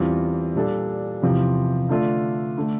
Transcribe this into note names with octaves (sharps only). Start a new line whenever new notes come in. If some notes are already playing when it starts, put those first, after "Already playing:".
Already playing: E2 E3 G3 C4 F4
A#2 G3 D4 A4
E2 C3 F3 C4 G4
D3 A3 D4 F4 A4
D3 A3